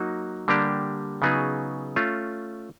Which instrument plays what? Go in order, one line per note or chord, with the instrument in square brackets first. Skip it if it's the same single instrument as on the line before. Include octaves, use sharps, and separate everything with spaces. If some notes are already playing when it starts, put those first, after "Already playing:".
Already playing: [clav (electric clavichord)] F#3 A#3 D#4 F#4
D3 G3 A#3 D4 G4
C#3 F#3 B3 D#4 G#4
A3 C#4 F4